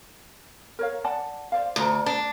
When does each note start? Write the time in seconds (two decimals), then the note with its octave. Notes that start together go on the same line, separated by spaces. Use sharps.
0.79 A#4 C#5 F5
1.04 D5 F#5 A5
1.52 C5 D5 F5
1.76 D2 C5 D5 A#5
2.06 D4